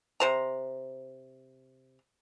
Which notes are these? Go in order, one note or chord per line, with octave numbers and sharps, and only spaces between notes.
C3 C5 A#5